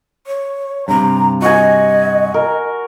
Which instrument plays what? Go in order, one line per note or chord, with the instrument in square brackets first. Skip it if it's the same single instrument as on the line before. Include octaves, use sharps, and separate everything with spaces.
[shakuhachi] C#5
[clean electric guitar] G2 C3 [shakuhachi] A#5
[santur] F#4 G#5 [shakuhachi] D#5
[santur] A#4